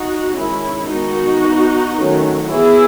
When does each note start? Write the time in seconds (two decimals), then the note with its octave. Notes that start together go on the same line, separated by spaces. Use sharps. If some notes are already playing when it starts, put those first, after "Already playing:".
Already playing: D#4 F#4
0.35 D#3 G#3 C#4 E4
0.88 D#3 G#3 B3 D#4 F#4
1.42 E3 B3
1.96 D#3 F#3 A3 C#4
2.49 E3 B3 E4 G#4